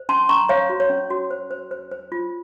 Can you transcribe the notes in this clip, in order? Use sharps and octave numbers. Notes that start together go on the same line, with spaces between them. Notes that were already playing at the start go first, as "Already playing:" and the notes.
Already playing: C5
C#4 A5 C6
C#4 A#5 C#6
C5 C#5 F5
F#4
C#5
C#4
F#4
C5
C5
C5
C5
F4